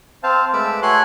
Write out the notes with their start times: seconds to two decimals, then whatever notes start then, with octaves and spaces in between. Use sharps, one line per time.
0.23 C4 C5 F5 A5
0.53 G#3 A3 B4 D6 E6
0.82 A3 F#4 C#5 G#5 C6 F#6